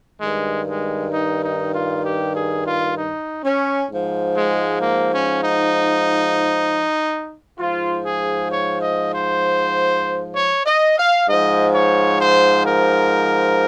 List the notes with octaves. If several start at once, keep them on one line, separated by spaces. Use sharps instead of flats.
G2 D#3 G#3
G#3
D#4
D#4
F4
G4
G#4
F4
D#4
C#4
G#2 F3
G#3
A#3
C#4
D#4
G#2 F3 F4
G#4
C#5
D#5
C5
C#5
D#5
F5
G#2 F3 D#5
C#5
C5
A#4